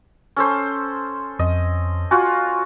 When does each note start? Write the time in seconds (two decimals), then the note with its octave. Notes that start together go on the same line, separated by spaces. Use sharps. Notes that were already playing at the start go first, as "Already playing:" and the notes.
0.36 C#4 A4 C5
1.39 F2 D#5
2.11 F4 F#4 G#5